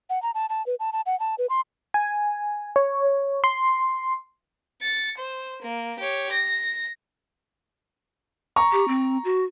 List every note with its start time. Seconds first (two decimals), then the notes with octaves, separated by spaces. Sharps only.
0.10 F#5
0.22 A#5
0.35 A5
0.49 A5
0.66 B4
0.80 A5
0.93 A5
1.06 F#5
1.20 A5
1.38 B4
1.50 C6
1.94 G#5
2.76 C#5
3.44 C6
4.82 A6 C#7
5.18 C5
5.62 A#3
6.00 G4 C#5
6.32 A#6
8.56 A#5 C#6
8.72 G4
8.88 C4
9.25 F#4